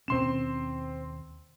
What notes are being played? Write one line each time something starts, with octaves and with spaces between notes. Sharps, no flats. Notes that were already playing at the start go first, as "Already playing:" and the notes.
D#2 B2 C4 C#4 C6 E7